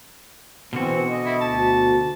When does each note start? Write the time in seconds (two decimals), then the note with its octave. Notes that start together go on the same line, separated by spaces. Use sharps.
0.73 B2 D3 E3 C4 F#4
1.09 D#5
1.26 E4
1.41 D2 A5